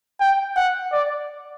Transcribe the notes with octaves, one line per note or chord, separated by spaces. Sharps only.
G5
F#5
D5